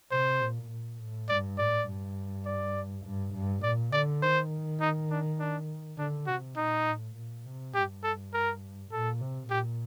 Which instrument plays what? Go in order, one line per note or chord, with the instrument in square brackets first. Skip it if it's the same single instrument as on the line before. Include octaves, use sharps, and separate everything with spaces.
[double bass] C3 [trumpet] C5
[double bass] A#2
A#2
A2
[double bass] G2 [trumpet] D5
[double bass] A2 [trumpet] D5
[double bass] G2
[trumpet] D5
[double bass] G2
G2
[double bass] A#2 [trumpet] D5
[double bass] D3 [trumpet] D5
[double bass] D#3 [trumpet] C5
[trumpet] D#4
D4
D4
[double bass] D3 [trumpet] D4
[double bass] C3 [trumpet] F#4
[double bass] A#2 [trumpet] D#4
[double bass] A2
A#2
C3
[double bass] G2 [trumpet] G4
[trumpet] A4
A#4
[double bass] A#2 [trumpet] A4
[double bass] C3
[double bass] A#2 [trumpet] G4